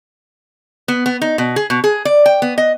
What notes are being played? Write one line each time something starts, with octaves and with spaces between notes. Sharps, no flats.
B3
B3
D#4
B2
G#4
B2
G#4
D5
G5
B3
D#5